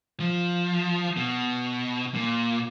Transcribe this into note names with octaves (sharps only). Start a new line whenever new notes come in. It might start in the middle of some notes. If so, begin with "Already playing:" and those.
F3
B2
A#2